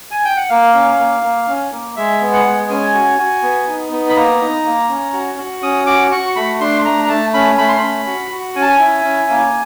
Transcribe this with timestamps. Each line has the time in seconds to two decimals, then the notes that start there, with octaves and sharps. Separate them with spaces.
0.11 G#5
0.25 G5
0.37 F#5
0.50 A#3 F5
0.74 C#4
0.99 A#3
1.23 A#3
1.48 C#4
1.72 A#3
1.96 G#3 E5
2.21 B3
2.33 F#5
2.45 G#3
2.70 C#4 G#5
2.94 F#4
3.19 F#4
3.43 B3
3.67 D#4
3.92 B3
4.09 B5
4.16 A#3 A#5
4.41 D#4
4.65 A#3
4.89 C#4
5.13 F#4
5.38 F#4
5.62 C#4 D#6
5.87 F#4 D6
6.11 F#4 C#6
6.36 A3 B5
6.61 D4 C6
6.85 A3 A#5
7.04 A#5
7.09 A3 A5
7.34 C#4 B5
7.58 A3 B5
7.68 C6
7.78 B5
7.83 C#4
8.07 F#4
8.31 F#4
8.56 C#4 G#5
8.62 A5
8.69 G#5
8.80 E4
9.05 C#4
9.30 A#3